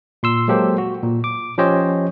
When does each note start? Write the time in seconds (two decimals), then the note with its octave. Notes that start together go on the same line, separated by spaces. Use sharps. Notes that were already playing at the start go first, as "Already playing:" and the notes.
0.23 A#2 C6 E6
0.48 F#3 G#3 A#3 G4 A4 C5
0.78 F#4
1.03 A#2
1.24 D6
1.58 F3 C#4 G4 C5 C#5 D#5